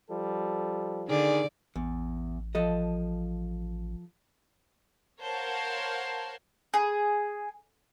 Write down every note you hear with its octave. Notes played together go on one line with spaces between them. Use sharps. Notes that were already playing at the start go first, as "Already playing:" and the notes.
F3 G3 A4
D3 D#3 G#4 D5
A1 E2
F3 A4 D#5
A#4 C5 C#5 F5 F#5 A5
G#4